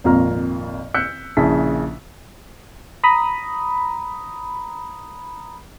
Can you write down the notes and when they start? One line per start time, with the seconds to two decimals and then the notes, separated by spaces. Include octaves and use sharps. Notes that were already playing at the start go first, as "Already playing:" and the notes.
0.04 G#1 F2 A#2 F4 A#5 F6
0.94 E6 F#6 G6 B6 C#7
1.37 A#1 C#3 E4 A5 B6
3.04 A#5 B5 D#6